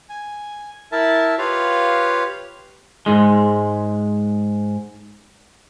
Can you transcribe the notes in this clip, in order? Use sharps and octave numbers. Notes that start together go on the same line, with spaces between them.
G#5
E4 A#4 E5 A5
F4 G4 B4 C#5 F5
G#2 G#3